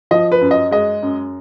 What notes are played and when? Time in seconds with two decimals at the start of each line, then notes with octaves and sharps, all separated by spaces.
0.11 F3 D#5
0.32 B4
0.41 F#2
0.51 D#5
0.71 G#3 D#5
1.02 F#2